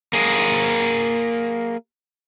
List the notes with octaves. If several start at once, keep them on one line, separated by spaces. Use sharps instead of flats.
A#3 G#4